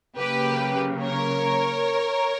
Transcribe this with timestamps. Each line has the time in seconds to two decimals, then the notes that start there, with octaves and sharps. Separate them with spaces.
0.17 C#3 F#3 A#3 G4 B4
1.03 A#4 C#5